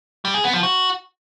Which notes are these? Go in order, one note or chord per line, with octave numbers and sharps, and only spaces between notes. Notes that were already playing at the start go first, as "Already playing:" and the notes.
G3
G#4
B3
F3
F#4